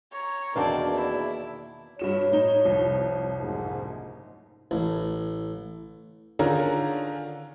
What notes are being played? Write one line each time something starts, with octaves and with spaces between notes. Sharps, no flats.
C#5 A#5
E2 B2 D#3 A#3 C4 D4 D5
E4
G2 F#4 C#5 E7
A2 D#4
C2 F2
F#1 D2 G#2
A1
D3 D#3 C#4 F4 G#4 A#4